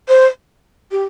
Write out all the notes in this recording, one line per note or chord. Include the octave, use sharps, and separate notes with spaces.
C5
G4